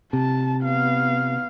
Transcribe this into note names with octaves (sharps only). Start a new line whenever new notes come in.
C3 A5
B3 F5